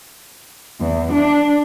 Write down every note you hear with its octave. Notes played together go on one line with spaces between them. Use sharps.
E2
D4